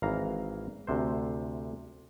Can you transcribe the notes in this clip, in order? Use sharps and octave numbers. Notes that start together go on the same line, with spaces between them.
G#1 E3 F5 A#5
D2 C3 C5